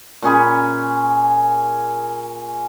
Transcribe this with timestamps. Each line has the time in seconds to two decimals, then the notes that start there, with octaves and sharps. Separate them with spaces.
0.22 A#2 C#4 G#4 B5